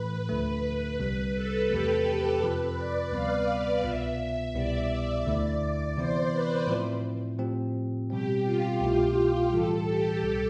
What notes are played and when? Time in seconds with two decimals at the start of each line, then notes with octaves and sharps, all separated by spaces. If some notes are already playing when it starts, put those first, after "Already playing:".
Already playing: A2 E3 A3 B4
0.29 D2 D3 F3 A3
0.99 C2 C3 G3 B4
1.35 A4
1.70 E2 C3 F3 A3 G4
2.06 A4
2.41 F2 C3 F3 C4 B4
2.77 D5
3.12 D2 C3 G3 B3 F5
3.84 C2 B2 B3 F4 E5
4.55 C2 B2 B3 E4 G4 D5
5.25 D2 D3 A3 E4
5.97 C3 E3 B3 E4 C5
6.32 B4
6.67 A2 F3 C4 E4
7.39 A2 F3 C4 G4
8.10 B2 G3 C4 G4
8.45 F4
8.81 C2 B2 A3 E4 G4
9.51 A2 E3 G3 A4
9.87 G4
10.23 C2 B2 G3